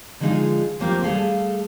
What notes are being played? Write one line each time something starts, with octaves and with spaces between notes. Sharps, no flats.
D3 F3 G#3 D#4 F4 G#4
F3 A3 A#3 C4 F4 G4
G3 A3 G#4 A4 F5